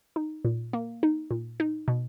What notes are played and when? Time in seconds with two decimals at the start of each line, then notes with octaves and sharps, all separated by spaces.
0.16 D#4
0.45 A#2
0.73 A#3
1.03 D#4
1.31 A#2
1.60 D#4
1.88 B2